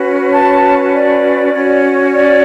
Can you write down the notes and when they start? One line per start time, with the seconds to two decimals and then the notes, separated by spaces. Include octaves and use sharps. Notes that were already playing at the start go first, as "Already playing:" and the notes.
Already playing: C#4 F#4 B4
0.32 A5
0.93 D5
1.53 C#4 F#4 C#5
2.14 D5